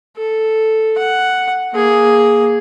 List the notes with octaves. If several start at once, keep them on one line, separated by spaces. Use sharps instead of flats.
A4
F#5
A#3 G#4